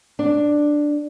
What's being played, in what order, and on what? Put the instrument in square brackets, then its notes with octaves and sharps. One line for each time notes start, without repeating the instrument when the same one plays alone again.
[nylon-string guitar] D4